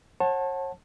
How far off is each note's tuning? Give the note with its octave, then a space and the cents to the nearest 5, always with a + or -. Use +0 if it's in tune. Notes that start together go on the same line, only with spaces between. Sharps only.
C#5 -40 F#5 +0 A5 +0